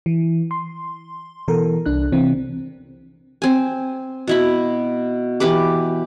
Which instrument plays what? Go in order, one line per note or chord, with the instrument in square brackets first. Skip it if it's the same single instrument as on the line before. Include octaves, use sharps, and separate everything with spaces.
[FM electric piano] E3
C6
B2 E3 A4 A#4
C2 D4 F#6
C3 E3 C4
[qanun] C4 G#5
B2 E4 B5
E3 G4 B4 D6